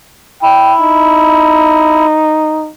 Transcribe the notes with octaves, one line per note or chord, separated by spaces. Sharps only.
E4 G5
D#4